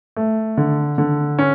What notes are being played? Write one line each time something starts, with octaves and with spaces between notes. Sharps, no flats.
A3
D3
D3
C#4